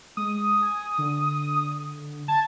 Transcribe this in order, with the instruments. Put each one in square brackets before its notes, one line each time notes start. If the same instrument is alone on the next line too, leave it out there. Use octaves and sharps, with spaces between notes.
[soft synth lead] G#3 [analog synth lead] D#6
[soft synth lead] G#5
D3
[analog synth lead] A5 [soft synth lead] G#6